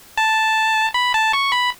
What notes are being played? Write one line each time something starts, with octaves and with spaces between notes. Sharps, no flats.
A5
B5
A5
C#6
B5